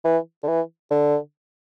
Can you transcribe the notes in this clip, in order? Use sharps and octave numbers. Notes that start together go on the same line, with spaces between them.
E3
D3
E3
D3